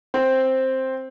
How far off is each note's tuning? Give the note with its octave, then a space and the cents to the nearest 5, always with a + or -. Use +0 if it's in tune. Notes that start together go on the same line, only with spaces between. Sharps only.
C4 +5